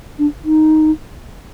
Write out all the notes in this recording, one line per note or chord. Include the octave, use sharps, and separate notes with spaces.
D4
D#4